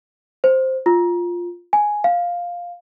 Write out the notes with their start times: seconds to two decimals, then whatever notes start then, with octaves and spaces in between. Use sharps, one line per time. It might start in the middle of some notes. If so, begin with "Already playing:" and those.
0.44 C5
0.86 F4
1.73 G#5
2.04 F5